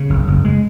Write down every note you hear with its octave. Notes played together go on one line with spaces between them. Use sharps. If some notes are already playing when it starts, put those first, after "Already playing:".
Already playing: C#3 A#3
F#1
F#1
G#3